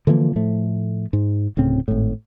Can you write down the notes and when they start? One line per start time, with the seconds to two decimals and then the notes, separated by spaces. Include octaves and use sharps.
0.07 D3 E3 F3 A#3
0.36 A2 F3 A3
1.13 G#2
1.57 D1 A2 C#3 C4
1.88 G#1 A2